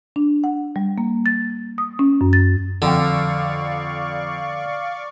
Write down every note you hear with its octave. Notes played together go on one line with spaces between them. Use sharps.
D4
F#5
G3
A#3
A6
D#6
C#4
F#2
A6
F2 D3 D5 F5 G5 C#6